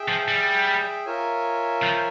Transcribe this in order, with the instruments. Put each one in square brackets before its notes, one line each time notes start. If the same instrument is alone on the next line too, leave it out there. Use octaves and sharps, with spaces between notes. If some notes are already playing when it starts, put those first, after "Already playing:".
Already playing: [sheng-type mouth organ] G#4 E5 G5
[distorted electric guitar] F3
G3
[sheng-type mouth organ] F4 A#4 C#5 E5 G#5
[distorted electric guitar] F3